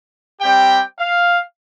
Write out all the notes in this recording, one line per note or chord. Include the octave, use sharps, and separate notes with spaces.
G3 C4 G4 G5
F5